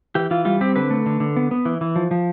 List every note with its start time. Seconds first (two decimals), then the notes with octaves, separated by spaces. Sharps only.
0.15 E3 G4
0.31 E3 F4
0.45 G3 F4
0.61 C4 G4
0.76 D3 B4
0.91 A3
1.06 D3
1.20 D3
1.37 B3
1.51 B3
1.65 E3
1.81 E3
1.96 F3
2.11 F3